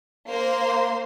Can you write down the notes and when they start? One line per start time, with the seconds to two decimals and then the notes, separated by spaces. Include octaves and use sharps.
0.29 A#3 C5 C6